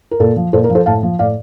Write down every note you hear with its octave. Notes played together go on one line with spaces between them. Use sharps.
A#4
A#2 A4
F3
A#2 A4 C5
A#4
F3
A4 C5
A2 F5 A5
F3
A2 D5 F5